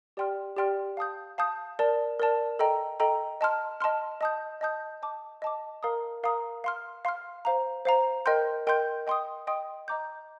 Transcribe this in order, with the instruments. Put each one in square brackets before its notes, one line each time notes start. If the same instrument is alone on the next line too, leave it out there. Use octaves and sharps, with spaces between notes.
[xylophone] G4 D5 G5 C6 F6
G4 D5 G5 C6 F6
F5 A5 D#6 G6
F5 A5 D#6 G6
A#4 D5 A5
A#4 D5 A5
A4 D#5 G5 A#5
A4 D#5 G5 A#5
D#5 A5 C6 F6
D#5 A5 C6 F6
D#5 A5 D#6 G6
D#5 A5 D#6 G6
D#5 A5 D6
D#5 A5 D6
A#4 F5 A#5 D#6
A#4 F5 A#5 D#6
F5 C6 F6
F5 C6 F6
C5 F5 A#5
C5 F5 A#5
A#4 D#5 G5 C6 G6
A#4 D#5 G5 C6 G6
D#5 G5 C6 D#6
D#5 G5 C6 D#6
D#5 A#5 D6 G6